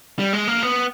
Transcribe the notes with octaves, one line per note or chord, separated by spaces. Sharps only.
G3
G#3
A#3
B3